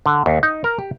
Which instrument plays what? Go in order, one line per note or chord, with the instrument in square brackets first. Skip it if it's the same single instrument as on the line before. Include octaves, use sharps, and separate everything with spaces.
[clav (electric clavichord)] D3
D#2
D#4
A#4
G4